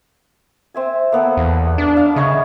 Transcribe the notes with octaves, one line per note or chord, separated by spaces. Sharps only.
C4 E5 G#5
A#3 B3 A4
E2
D4
F5
C#3 C#5 D#5 E5